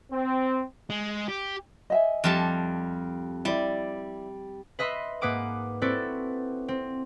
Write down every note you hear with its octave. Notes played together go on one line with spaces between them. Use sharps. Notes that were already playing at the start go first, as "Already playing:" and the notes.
C4
G#3
G4
D#5 E5 G#5
F2 G3 A5
G3 E4 D5
B4 D#5 E5 B5 C6
G#2 A#3 B4 F#5 D6 D#6
C4 E4 F#4 A4 B4 D5
C4